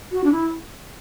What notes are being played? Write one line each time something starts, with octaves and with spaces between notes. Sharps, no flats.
F#4
D4
E4